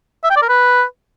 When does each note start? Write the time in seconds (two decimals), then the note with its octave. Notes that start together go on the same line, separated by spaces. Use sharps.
0.24 E5
0.30 G5
0.36 D5
0.42 A#4
0.49 B4